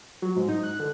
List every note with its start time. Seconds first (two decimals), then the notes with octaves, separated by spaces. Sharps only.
0.22 F#3
0.36 G#2
0.49 D#4
0.63 F#6
0.80 D3